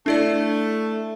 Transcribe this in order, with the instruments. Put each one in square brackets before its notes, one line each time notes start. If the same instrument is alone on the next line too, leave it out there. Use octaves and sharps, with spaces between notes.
[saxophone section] A3 [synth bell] D4 E4 D5